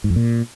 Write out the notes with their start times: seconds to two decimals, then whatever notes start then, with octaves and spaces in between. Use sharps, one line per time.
0.04 G#2
0.10 F2
0.16 A#2